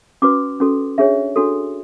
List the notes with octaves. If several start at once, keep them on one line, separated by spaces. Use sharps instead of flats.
C#4 F#4 B4 D6
C#4 F#4 A4
D4 G#4 C#5 E5
D4 F#4 A4